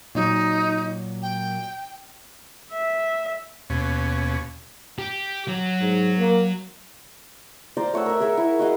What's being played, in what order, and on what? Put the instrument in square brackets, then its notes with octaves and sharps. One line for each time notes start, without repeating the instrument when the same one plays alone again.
[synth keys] A#2 F#3 [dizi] D#4
[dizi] G5
[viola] E5
[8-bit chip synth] D#2 [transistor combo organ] B2 C#4
[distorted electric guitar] G4
F#3
[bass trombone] G#2
A#3
[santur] C5 D5 F5 A#5
A3 C#5 F#5 E6
A#4 E5
G#4 A#4 E5
E4
F#4 D#5 F5